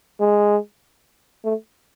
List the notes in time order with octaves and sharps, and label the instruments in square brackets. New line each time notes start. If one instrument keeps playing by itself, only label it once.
[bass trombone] G#3
A3